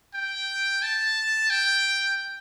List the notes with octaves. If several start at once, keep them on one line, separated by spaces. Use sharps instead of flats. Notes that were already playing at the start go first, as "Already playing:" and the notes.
G5
A5
G5